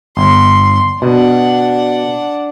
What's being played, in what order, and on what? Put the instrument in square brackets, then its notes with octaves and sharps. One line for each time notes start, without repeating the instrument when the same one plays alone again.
[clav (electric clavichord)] G1 [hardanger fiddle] C6
[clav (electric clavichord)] B2 [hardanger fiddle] D4 F#5